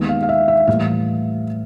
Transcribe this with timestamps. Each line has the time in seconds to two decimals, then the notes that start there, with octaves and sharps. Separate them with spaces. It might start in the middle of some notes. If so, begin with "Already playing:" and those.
Already playing: D#2 D#3 G#3 B3
0.09 F5
0.23 F5
0.29 E5
0.48 E5
0.67 A2 E3 G3 A#3 F5